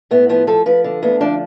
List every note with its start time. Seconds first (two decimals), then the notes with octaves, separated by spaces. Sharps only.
0.11 A2 B3
0.29 F3 B3
0.47 F3 A4
0.66 F3 B4
0.84 D3
1.03 D2 B3
1.21 F3 D4